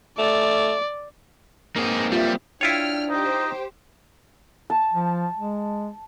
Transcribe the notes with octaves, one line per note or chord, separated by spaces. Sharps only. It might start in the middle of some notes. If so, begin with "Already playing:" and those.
A3 D5
A#3 C4 D#4 G#4
G3 F4 E5
D4 E4 F4 C#5 G5 F6
D#4 G4 C5
A5
F3
G#3